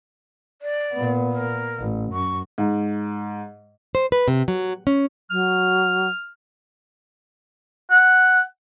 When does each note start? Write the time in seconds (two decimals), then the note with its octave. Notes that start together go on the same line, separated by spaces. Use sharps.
0.62 D5
0.94 A#2 B3
1.32 A#4
1.79 A1
2.13 F#2 C#6
2.58 G#2
3.95 C5
4.12 B4
4.28 C3
4.48 F#3
4.87 C#4
5.31 F#3 F6
7.90 F#5